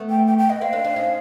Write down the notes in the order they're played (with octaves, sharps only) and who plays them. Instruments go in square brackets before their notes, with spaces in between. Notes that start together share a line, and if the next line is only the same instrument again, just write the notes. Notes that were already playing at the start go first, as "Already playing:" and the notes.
Already playing: [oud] A3 B3
[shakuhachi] G5
G5
G5
[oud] B3 [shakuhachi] D#5
[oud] A#3 C4 [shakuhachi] F5
[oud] C4 D4
C4 D4
C#4 D#4